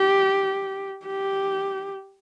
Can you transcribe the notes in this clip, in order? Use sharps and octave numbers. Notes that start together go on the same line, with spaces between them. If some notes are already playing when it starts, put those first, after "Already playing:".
Already playing: G4
G4